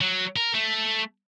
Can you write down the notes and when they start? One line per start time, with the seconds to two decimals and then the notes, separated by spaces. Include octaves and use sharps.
0.01 F#3
0.36 A#4
0.54 A3